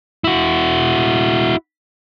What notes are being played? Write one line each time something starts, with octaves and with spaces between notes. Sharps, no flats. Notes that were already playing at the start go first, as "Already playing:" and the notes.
E4 F#4